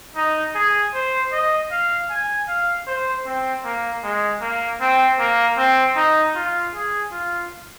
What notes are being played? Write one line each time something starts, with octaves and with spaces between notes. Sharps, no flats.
D#4
G#4
C5
D#5
F5
G#5
F5
C5
C4
A#3
G#3
A#3
C4
A#3
C4
D#4
F4
G#4
F4